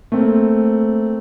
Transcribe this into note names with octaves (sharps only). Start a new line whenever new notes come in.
A3 A#3 C4